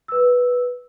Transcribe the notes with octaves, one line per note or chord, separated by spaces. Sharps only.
B4 E6